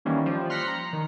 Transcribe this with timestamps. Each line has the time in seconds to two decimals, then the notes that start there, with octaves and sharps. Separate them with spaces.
0.05 D#3 E3 G3 A#3 C#4
0.26 F3 G3
0.50 C6 F6 F#6 A#6 B6 C#7
0.67 A#5
0.93 D#3